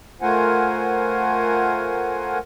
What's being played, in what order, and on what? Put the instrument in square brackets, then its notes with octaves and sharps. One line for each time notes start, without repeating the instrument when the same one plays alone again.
[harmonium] A3 F4 A#4 C5 F#5 G#5